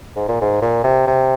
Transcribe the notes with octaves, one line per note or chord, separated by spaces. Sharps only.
G#2
A#2
G#2
A#2
C3
C3